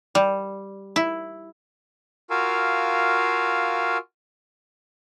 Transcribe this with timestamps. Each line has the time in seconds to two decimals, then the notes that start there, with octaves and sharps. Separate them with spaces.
0.15 G3
0.96 E4
2.30 F4 F#4 A#4 F5 G#5 E6